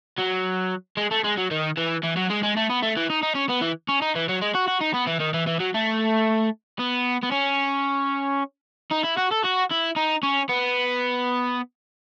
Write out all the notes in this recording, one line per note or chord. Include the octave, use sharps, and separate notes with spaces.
F#3
G#3
A3
G#3
F#3
D#3
E3
E3
F#3
G#3
G#3
A3
B3
A3
E3
D#4
D#4
C#4
B3
E3
C#4
D#4
E3
F#3
G#3
F#4
F#4
D#4
B3
E3
D#3
E3
E3
F#3
A3
B3
B3
C#4
D#4
E4
F#4
A4
F#4
E4
D#4
C#4
B3